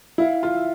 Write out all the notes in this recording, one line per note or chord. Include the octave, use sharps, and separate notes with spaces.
E4 F5
F4
E5